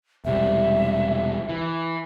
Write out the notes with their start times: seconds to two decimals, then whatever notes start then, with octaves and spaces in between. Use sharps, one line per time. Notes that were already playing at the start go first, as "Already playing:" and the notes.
0.25 E1 C3 G3 E5
1.49 E3